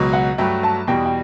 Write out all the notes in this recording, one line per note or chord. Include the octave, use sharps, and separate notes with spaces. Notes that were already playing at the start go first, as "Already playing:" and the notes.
Already playing: C#2 B2 F#3
F#5
G2 F#3 A3 G5
A5
E2 B2 G3 G5
G5